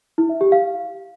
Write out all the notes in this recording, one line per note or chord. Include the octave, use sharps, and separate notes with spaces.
E4
E5
G4
F5